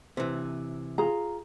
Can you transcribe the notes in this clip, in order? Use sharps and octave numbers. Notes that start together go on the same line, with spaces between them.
C3 E3
F4 G#4 A#5